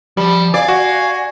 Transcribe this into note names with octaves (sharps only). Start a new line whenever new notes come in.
F3 G3
D5 F5 G#5
F#4